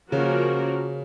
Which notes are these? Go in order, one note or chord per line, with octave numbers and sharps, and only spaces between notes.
C#3 F3 A#3 C#4 F#4 A#4